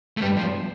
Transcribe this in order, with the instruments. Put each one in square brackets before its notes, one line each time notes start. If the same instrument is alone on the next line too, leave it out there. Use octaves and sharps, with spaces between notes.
[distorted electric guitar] A3
[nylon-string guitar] G2 [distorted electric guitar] G3
[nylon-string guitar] A2
[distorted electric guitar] F3
[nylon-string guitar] E2